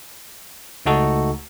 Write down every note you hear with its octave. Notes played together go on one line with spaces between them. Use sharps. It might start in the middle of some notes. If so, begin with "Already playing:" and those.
C#2 A3 D#4 F#4 A4